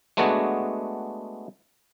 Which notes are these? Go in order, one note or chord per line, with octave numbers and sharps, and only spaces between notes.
G#3 A3 B3 D4 F#4 G#4